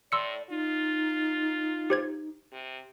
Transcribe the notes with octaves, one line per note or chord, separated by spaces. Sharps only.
A2 D5 C6 E6 C#7
D#4 F4
G4 C5 G#6
C3